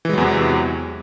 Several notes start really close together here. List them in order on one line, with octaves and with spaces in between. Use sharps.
E3 G#3 F#3 E2 C3